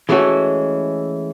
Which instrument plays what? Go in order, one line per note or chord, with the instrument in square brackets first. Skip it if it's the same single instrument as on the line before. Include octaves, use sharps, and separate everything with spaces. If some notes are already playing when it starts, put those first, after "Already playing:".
[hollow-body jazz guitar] E3 G#3 A3 C#4 F#4